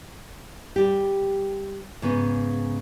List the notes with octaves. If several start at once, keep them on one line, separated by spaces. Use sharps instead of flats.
G3 G4
G#2 C#3 B3